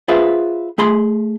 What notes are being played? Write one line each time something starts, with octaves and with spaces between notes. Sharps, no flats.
F4 G#4 B4 C5 E5
A3 G#4 B5 C6